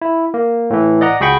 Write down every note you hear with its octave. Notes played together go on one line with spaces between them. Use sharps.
E4
A#3
A2 E3
D5 D#5 F#5 A#5
C#2 F#4 G#4 G5 B5 C#6